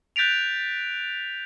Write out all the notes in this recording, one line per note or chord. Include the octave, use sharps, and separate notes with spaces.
F#6 G6 A6 B6 D7 F7